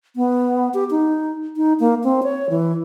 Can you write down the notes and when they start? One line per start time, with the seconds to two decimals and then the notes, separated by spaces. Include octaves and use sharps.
0.16 B3
0.74 G4
0.91 D#4
1.57 D#4
1.80 A#3
2.04 C4
2.23 C#5
2.50 E3